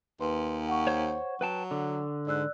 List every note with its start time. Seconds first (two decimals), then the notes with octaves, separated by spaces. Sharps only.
0.20 D#2 B4 C6
0.69 F#5 C#6
0.87 C5 C#5
1.41 F#3 B4 G5 A5
1.71 D3
2.27 G#2 D5 E6 F#6